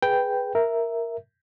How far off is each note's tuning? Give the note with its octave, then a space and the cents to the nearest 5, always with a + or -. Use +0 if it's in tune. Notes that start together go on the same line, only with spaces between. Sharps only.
G#4 +0 B4 +0 G5 +0
A#4 +0 E5 +0